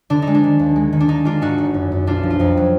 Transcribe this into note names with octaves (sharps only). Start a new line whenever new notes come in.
D3 D4
D#4
G#3
D4
D#3
D#2
G#3
D#3
D4
G#3 D#4
G#3 D4 F4
G#2 D#4 F#4
G#1
F#2
F#2
B1 D4 F4
F3
F4
F2 D#4
F#3